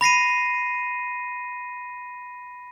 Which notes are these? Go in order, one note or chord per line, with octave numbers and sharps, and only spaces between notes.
B5 A#6 C7 D#7